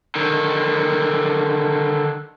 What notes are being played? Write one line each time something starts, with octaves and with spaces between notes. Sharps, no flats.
D3 D#3